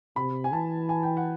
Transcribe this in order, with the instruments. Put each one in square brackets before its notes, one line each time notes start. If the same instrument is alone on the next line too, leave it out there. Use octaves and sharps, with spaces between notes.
[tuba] C3 [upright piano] B5
[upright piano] G#5
[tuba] E3 [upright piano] A5
[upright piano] G#5
G5
F#5